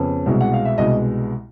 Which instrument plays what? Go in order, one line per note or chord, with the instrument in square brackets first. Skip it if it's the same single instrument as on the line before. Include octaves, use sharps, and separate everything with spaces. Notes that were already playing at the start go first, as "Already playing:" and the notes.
Already playing: [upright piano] F2 C#3 B3
C2 B2 G#3
F#5
F5
E5
C2 B2 G#3 D#5